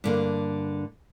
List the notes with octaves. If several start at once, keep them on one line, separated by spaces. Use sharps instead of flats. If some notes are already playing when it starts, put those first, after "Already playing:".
G2 D3 A#3